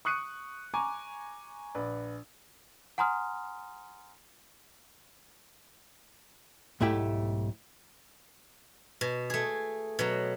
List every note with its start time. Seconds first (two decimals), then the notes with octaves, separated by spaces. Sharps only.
0.05 C#6 D#6 F#6 C#7 D#7
0.74 G#5 A#5 C#6 D6
1.75 A#1 B4 D5
2.98 F#5 G#5 A#5 C6 D#6 F6
6.81 B1 G#2 A3 E4 G4 G5
9.01 B2
9.30 A3 G#4
9.99 B2 F#3